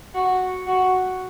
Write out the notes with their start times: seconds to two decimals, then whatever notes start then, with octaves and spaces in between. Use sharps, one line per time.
0.15 F#4
0.67 F#4